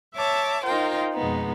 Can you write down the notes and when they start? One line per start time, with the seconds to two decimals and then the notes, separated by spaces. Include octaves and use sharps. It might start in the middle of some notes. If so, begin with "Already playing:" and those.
0.15 C#5 E5 A5 D6
0.64 D#4 F4 A#4 C5 G5
1.13 F2 B2 G#3 B3 D#4